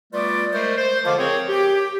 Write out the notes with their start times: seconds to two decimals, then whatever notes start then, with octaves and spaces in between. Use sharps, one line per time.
0.13 G3 A3 B3 F4 B4 D5
0.53 G#3 A3 A#4 C5
0.78 C5
1.05 D3 F3 G#3 F4 F5 D6
1.18 C4 G#4 A#4 C#5
1.49 G4